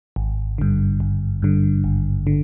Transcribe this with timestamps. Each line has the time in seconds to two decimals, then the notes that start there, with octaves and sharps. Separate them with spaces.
0.16 G#1
0.58 G2 D3
1.00 G#1
1.42 G2 D3
1.84 G#1
2.27 D3